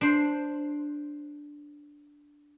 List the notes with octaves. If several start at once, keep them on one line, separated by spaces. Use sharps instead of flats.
D4 C5